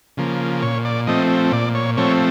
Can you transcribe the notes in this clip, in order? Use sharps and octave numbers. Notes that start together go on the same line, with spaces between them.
C#3 F3 A#3
A#2 C#5
D5
F3 A3 C4 D#5
A#2 D5
C#5
F3 A3 C4 C#5